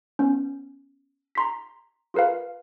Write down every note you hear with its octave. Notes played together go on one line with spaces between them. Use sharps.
B3 C#4
A#5 C6 B6
F4 G#4 A#4 B4 F5